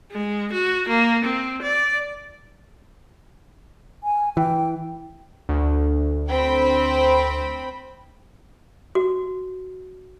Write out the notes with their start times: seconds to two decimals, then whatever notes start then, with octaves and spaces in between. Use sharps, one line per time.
0.11 G#3
0.53 F#4
0.89 A#3
1.25 C4
1.62 D5
4.04 G#5
4.37 E3 G5
5.49 D2
6.29 C4 G5 B5
8.95 F#4